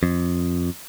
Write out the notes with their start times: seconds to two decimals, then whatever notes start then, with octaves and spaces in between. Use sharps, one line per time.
0.03 F2